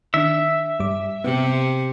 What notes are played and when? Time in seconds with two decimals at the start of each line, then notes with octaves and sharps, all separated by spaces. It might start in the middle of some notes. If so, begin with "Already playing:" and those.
0.14 D#3 D4 E5
0.80 G2 G3 D6
1.24 C3 B3